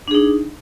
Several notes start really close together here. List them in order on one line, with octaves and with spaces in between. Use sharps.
D4 G#4 D#4